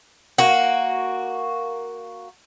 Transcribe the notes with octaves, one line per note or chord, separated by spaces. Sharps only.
A#3 F#4